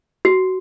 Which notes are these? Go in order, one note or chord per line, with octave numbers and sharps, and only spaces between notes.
F#4